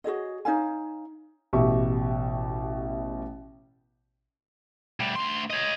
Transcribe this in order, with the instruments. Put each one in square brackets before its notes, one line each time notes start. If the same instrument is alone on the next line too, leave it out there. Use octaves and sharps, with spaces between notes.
[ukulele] F#4 G#4 C#5 D#5
D#4 C#5 F5 G#5
[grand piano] A1 B2 G4 E5 C#6
[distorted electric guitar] D2 G3
D2 C6
C#5 D#5